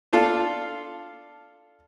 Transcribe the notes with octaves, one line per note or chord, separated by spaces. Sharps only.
D4 F4 A4 F5